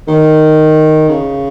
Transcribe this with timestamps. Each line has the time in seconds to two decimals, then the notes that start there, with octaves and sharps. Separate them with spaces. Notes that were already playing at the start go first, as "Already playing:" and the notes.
0.08 D#3
1.09 C#3